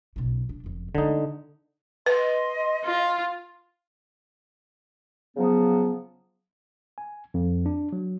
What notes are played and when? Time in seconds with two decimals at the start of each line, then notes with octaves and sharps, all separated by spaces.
0.16 B1 C#3
0.49 D4
0.64 F#1 F2
0.95 D3 G#3 A3 D#4
2.06 B4 D#5 C6
2.85 F4
5.36 C#3 F3 F#3 B3
6.98 G#5
7.34 F2
7.66 D4
7.93 F#3